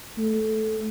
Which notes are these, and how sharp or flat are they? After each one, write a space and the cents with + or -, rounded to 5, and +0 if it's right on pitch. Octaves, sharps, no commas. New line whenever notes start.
A3 -10